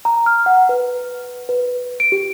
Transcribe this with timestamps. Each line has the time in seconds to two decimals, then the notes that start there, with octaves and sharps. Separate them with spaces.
0.05 A#5
0.26 F6
0.46 F#5
0.69 B4
1.49 B4
2.00 D7
2.12 G4